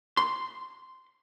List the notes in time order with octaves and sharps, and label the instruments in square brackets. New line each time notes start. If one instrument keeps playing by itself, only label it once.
[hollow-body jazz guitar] C6